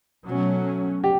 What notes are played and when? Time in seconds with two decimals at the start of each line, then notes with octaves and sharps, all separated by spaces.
0.25 B2 F#3 A3 C#4
1.04 G4